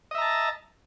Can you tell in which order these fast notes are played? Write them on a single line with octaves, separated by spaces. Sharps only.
D#5 E5 A#5 A5